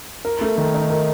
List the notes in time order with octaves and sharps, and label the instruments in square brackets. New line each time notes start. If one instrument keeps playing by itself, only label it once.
[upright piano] A#4
A3
D#3
D#4
A#4